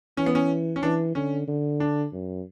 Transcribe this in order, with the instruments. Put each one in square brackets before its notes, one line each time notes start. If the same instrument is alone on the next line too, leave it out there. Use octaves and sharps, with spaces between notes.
[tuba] E3 [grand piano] C#4
[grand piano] B3
C#4
C#4
[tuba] E3 [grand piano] D4
[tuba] D3 [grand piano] C#4
[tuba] D3
[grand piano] D4
[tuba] F#2